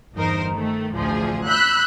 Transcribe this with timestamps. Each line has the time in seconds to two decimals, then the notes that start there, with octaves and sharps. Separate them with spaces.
0.15 G1 E2 D#4 A#4 C5
0.51 D#3 A3
0.94 A1 D2 F3 G#4
1.47 B5 E6 F#6 G6 B6